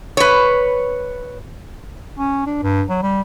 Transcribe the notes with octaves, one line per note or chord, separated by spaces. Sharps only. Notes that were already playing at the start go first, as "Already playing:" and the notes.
B4 C#5
C#4
D4
G2
F#3
G3